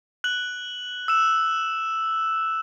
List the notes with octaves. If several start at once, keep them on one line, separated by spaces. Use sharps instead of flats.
F#6 F#7
E6 E7